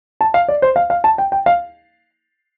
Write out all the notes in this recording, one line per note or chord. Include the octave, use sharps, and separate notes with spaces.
A5
F5
D5
C5
F5
F5
A5
G5
G5
F5